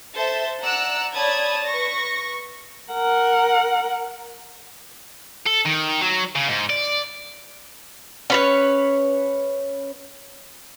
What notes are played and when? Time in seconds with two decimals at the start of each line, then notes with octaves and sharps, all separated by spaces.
0.14 A4 C5 E5
0.62 D5 F#5 A#5 E6 F#6
1.14 C#5 D5 A5 B5 D#6 G#6
1.64 B4 C#6 A#6
2.93 A#4 F#5
5.47 A4
5.66 D#3
6.02 F#3
6.35 C#3
6.48 G#2
6.70 D5
8.30 C#4 B4 C#5